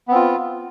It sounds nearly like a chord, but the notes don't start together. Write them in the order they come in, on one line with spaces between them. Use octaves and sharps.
B3 C4 F4